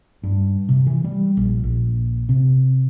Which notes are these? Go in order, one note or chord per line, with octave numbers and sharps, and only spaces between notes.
G2
C3
E3
G3
A#1
A#1
C3